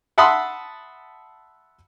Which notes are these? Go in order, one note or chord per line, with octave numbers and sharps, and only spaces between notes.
E5 F#5 A5 B5 C6 D#6